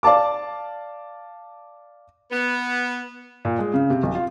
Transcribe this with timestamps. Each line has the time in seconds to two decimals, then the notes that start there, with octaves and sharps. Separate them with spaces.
0.03 D5 F5 A5 D6
2.32 B3
3.45 A#2
3.59 G#3
3.74 C#3
3.90 C3
4.03 B1
4.15 F4